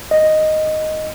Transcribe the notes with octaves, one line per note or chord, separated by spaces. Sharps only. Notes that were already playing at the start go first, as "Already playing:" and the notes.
D#5